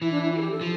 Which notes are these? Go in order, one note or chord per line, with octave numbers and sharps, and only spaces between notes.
E3 E4
D4
E4
F4
A4
G4
A4
F3